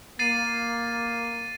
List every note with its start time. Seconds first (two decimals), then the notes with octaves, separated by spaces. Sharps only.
0.19 A#3 A6 C7 D#7